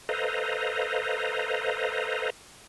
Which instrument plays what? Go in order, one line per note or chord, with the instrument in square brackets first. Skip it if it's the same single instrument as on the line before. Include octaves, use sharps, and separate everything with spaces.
[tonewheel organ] A4 B4 C5 D#5 F5 A#5